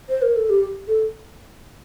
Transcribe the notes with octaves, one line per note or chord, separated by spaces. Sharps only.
C5
A#4
A4
G4
A4